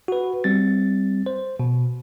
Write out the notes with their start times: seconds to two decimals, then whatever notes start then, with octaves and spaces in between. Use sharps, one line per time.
0.08 F#4 B4
0.44 G3 C4 A6
1.26 C5
1.60 B2